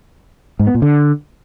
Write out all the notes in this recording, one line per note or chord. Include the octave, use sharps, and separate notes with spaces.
G#2
B3
A#2
D3